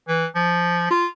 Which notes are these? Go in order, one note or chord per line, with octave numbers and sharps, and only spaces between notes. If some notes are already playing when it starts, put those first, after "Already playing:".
E3
F3
F4